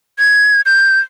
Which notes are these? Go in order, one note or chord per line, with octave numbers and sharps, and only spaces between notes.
G#6
G6